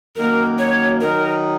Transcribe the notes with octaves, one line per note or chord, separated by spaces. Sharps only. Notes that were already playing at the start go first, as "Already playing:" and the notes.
F#2 D#3 A#3 F#4 A#4
C#5
D#3 F#3 D#4 A#4